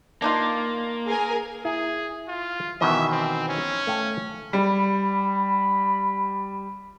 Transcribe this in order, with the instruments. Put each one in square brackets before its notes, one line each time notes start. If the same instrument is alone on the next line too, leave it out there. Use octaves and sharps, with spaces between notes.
[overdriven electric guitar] A#3 [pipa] D4 D#4 F4
[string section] G#4 A#4 G#5
[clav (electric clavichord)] E4 A#5 [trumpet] G#4
[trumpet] F4
[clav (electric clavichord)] B2 D#3 E3 [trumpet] E5
[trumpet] C4
C#4
[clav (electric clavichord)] A3 F5 G5
[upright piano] G3 [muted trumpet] B5